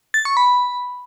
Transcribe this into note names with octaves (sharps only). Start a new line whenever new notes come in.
A6
C#6
B5